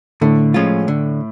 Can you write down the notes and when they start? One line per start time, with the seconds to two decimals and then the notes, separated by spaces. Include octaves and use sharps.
0.21 A2 D3 A3
0.54 F3 G#3 C#4 F4
0.88 D3